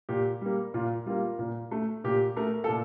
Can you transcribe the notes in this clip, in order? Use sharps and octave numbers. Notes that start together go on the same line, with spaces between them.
A#2 G4
G3 A#3
A#2 F4
G3 A#3 F4
A#2
A3
A#2 G4
A3 A#4
A4
A#2